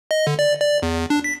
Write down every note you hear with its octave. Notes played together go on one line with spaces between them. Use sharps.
D#5
D3
D5
D5
E2
D4
B6